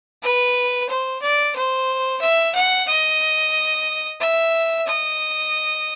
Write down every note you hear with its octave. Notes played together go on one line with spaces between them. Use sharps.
B4
C5
D5
C5
E5
F#5
D#5
E5
D#5